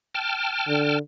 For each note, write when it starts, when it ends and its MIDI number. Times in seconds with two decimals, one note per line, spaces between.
0.15 0.99 79
0.15 0.99 81
0.15 0.99 89
0.68 0.98 50